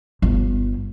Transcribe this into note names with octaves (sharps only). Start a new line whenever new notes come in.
G1